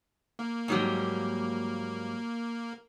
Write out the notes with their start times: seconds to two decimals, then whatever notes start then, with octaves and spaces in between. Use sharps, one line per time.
0.39 A#3
0.68 G#2 F#3 G3